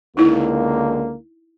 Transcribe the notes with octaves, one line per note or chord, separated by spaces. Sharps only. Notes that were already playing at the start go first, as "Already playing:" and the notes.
C#2 D3 A#3 D#4 E4